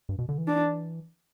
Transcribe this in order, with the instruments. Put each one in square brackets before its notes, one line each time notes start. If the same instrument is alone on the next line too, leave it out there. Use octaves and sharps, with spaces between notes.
[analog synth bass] G2
B2
D3
E3
[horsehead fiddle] D4